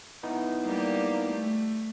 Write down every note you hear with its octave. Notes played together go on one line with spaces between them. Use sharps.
B3 D#4 E4
G3 A#3 G4
A3